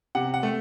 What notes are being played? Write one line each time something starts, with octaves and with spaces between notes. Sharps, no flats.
C3 F#5
F#5
A3